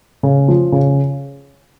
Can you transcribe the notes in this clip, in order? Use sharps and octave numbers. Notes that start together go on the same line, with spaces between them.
C#3
F3
C#3